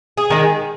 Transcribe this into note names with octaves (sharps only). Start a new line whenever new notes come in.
G#4
D#3 G#3